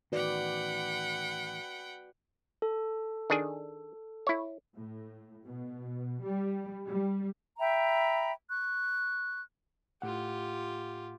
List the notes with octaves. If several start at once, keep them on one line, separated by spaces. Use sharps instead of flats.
A1 D#3 F#4 B4 D5 F#5 G5 B5
A4
D#3 D4 G#4
E4 C#5
A2
B2
G3
G3
E5 G5 A#5 B5
C#6 F#6
A2 F4 G4 F#5